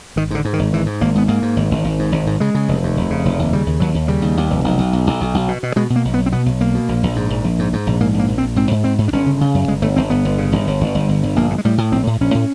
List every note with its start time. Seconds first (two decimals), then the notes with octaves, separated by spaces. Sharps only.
0.16 G#1 D#3
0.31 G#2 D3
0.45 G#2
0.53 D#3
0.59 G#1
0.73 G#2 E3
0.86 G#2
1.01 G#1 A#3
1.15 G#2 B3
1.28 G#2 A#3
1.42 G#2
1.56 G#1
1.71 G#1
1.84 G#1
1.99 G#2
2.12 G#1
2.27 G#2
2.40 C#3 G#3
2.55 C#3
2.69 F1
2.83 D#2
2.97 F1
3.10 C#3
3.25 F1
3.39 D#2
3.53 C#3 G3
3.66 D#2
3.80 D#2 F#3
3.94 D#2
4.08 C#3 G3
4.22 D#2
4.37 D#2
4.50 F1
4.64 B1
4.78 B1
4.93 B1
5.07 B1
5.21 B1
5.34 B1
5.48 B2
5.63 B2
5.76 B2 G#3
5.90 B2
5.96 A#3
6.05 B1
6.14 B3
6.18 B1
6.26 C4
6.32 B2 B3
6.46 B1
6.61 B1 A#3
6.75 B2
6.88 A#1
7.03 A#1
7.16 G#2
7.30 A#1
7.44 A#1
7.59 G#2
7.73 G#2
7.87 A#1
8.00 G#2 A#3
8.14 A#1 A#3
8.28 A#1
8.38 C4
8.43 A#1
8.56 G#2 C4
8.71 G#2
8.84 G#2 C4
8.98 G#2
9.08 D4
9.12 G1 C#4
9.26 C#3
9.41 C#3
9.54 F#2
9.68 G1 G#3
9.82 G1 A3
9.96 G1 C4
10.10 G1 B3
10.25 G1
10.38 C#3
10.52 G1
10.67 G1
10.81 G1
10.95 G1
11.09 G1
11.23 G1
11.36 A#1 A#3
11.50 A2
11.58 G#3
11.65 A2 G3
11.78 A2
11.92 A#1 C4
12.07 A2
12.21 A#1 C#4
12.34 A2